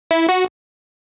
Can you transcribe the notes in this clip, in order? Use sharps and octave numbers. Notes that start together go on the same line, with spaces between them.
E4
F#4